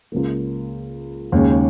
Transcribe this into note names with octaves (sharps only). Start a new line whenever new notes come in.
C#2 C#3 A#3
D#2 C#3 G#3 C#4